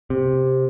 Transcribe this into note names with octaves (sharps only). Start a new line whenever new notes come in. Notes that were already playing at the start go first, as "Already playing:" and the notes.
C3